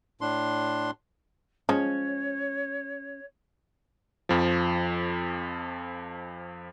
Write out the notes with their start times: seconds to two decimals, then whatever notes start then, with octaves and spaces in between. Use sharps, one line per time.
0.21 A2 D4 C6
1.69 F3 G#3 C#4 C#5
4.29 F2 F3